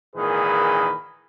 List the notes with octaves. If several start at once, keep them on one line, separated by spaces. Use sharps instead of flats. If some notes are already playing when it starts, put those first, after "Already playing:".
G#1 A#2 D#3 E3 G#4 B4